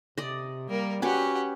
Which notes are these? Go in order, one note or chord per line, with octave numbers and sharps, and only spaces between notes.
C3 D5 D#5
G3 A#3 A#4
C#4 F#4 G4 B4 F#5 D6